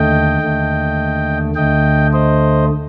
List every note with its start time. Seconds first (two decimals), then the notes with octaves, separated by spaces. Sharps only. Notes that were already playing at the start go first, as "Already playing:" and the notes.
Already playing: D#2 D3 A3 D#5 G5
0.41 D#2 D3 A3
1.55 D2 D3 A3 D#5 G5
2.13 C5 D#5